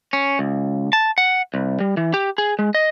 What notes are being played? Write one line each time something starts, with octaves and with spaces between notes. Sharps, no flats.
C#4
C#2
A5
F#5
C2
G3
E3
G4
G#4
G#3
D#5